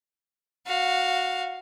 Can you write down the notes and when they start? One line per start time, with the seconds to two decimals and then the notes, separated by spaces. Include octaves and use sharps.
0.66 F#4 F5